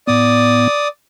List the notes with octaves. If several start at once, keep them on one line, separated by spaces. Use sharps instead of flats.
A2 B3 D5 D#6